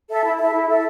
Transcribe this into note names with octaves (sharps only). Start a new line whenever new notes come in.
A4 E5
E4
A4 E5
E4
A4 E5